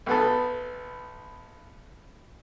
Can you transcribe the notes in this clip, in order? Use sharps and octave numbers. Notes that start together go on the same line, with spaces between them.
B1 B3 A4